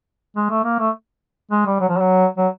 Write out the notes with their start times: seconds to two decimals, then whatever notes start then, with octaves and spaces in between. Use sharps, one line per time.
0.37 G#3
0.51 A3
0.65 A#3
0.79 A3
1.52 G#3
1.66 G3
1.80 F#3
1.89 F3
1.99 F#3
2.38 F#3